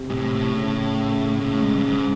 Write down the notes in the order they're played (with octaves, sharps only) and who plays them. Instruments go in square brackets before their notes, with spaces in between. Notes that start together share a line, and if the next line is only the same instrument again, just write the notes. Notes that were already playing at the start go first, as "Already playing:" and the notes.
Already playing: [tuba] C3
[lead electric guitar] G#2
A2
A2
[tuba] C#3
[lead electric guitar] A2
G#2
G2
G#2